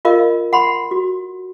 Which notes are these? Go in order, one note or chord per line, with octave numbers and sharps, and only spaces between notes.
F4 A#4 D#5 F5
F#5 B5 C6
F#4